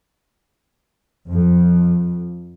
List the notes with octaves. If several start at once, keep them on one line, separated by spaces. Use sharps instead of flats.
F2